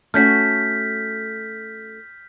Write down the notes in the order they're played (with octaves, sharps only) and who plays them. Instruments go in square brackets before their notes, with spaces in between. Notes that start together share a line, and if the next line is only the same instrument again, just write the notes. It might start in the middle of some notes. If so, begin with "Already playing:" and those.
[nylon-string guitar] A3 C#4 F#4 [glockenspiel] F6 G6 B6